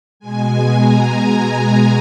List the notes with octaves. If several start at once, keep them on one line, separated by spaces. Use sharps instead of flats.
B2 G#3 G#5
A#5